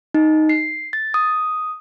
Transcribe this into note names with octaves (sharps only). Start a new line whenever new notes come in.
D#4
C7
A6
D#6